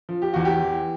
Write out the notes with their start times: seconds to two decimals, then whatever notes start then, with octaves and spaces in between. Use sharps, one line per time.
0.09 F3
0.22 G4
0.34 E2 F#4
0.45 G4
0.62 E3